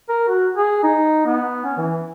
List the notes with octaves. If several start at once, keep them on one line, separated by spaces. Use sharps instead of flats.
A#4
F#4
G#4
D#4
B3
C#4
E3